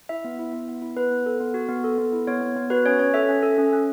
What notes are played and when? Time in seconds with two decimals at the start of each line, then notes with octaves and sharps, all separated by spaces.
0.09 E4 E5
0.25 B3
0.39 E4
0.53 B3
0.68 B3
0.82 E4
0.97 B3 B4
1.11 B3
1.26 A4
1.40 B3
1.54 F#4
1.69 B3
1.84 A4
1.98 B3
2.13 E4
2.27 B3 C#5
2.41 B3
2.56 B3
2.70 F#4 B4
2.86 C#4 C#5
2.99 C#4 C#5
3.14 A4 E5
3.29 C#4
3.43 A4
3.58 C#4
3.73 C#4